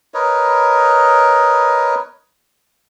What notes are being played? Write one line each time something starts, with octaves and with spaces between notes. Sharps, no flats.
A#4 B4 C#5 D#5